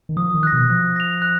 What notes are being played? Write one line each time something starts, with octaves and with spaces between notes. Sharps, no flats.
D#3
F3 D#6
D#3
F#6 A#6
B2
F3 F#6
A#6 F7
F#6